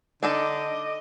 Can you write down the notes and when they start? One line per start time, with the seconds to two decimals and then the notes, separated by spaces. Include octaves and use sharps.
0.23 D3 D4 D#4 A4 D#5 D6